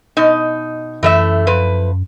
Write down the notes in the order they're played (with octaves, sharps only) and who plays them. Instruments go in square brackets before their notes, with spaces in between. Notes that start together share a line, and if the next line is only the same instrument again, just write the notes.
[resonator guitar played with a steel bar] B2 D#4
[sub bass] F#2 [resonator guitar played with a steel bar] E3 A3 E5
[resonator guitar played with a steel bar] F3 B4